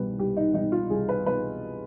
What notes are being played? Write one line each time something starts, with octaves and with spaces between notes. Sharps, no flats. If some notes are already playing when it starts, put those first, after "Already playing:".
Already playing: C2 B2 G3 B4
C2 G4
D#4
B2 G3 D#4
F4
C2 G#4
B4
B2 G3 B4